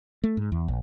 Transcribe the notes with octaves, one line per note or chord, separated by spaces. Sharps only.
A3
G#2
E2
A#1